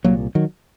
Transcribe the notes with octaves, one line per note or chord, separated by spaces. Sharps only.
C2 A#2 F#3 A#3
D#3 F#3